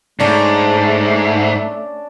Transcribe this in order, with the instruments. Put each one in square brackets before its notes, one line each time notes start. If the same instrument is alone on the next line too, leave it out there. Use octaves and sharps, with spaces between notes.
[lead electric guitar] G#2 [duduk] A3 [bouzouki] C#4 D4